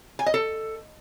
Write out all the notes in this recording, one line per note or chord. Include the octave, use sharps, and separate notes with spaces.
G#5
D#5
A4